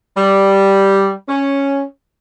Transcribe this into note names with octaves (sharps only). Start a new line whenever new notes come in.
G3
C#4